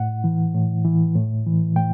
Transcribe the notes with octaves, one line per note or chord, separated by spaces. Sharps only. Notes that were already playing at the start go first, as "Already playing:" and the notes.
Already playing: A2 F#5
E3
A2
E3
A2
E3
A2 G5